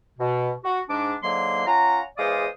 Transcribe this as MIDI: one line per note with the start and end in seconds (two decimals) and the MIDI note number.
0.19 0.52 47
0.64 0.80 66
0.89 1.14 44
0.89 1.14 62
0.89 1.14 86
1.23 1.63 44
1.23 1.63 50
1.23 1.63 54
1.23 1.63 58
1.23 1.63 84
1.67 2.01 61
1.67 2.01 65
1.67 2.01 78
1.67 2.01 82
2.18 2.47 40
2.18 2.47 56
2.18 2.47 72
2.18 2.47 74
2.18 2.47 77
2.18 2.47 87